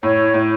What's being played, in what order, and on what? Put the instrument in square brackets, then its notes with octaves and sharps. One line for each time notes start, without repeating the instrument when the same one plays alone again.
[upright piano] A2 [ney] C#5
[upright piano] A2